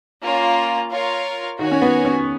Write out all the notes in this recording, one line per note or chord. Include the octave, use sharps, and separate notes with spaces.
A#3 C#4 F4
F4 A#4 C#5 F5
D#3 F#4 C#5 G#5
C#4
B3
C#4